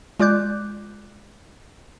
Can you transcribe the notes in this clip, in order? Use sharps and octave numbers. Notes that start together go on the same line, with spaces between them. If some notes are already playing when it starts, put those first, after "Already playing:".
G#3 F4 D5 D6 F#6 G6